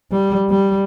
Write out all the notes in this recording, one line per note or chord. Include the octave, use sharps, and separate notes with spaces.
G3
G3